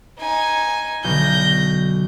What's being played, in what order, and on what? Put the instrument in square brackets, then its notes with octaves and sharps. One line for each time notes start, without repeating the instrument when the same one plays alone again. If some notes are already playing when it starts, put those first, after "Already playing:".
[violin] D#4 G#5
[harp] B1 D3 [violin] G6 A#6